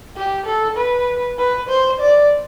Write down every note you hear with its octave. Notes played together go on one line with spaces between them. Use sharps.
G4
A4
B4
B4
C5
D5